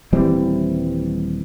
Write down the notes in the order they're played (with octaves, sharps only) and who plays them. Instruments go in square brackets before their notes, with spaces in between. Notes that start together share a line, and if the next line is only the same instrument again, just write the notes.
[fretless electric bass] D#1 E3 G3 C4